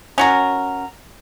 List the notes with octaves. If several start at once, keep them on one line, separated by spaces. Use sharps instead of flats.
C#4 F#4 A#4